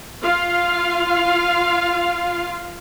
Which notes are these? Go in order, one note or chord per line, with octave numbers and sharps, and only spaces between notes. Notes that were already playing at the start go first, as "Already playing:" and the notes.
F4 F5